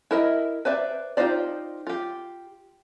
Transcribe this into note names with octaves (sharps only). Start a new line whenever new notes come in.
E4 A#4 D#5 E5
B4 C5 D5 E5
D#4 F4 G4 C5 D5
F4 G4